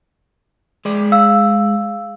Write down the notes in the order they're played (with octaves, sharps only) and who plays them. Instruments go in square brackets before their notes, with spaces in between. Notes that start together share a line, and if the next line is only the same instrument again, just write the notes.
[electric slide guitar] G#3 D5
[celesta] F5 E6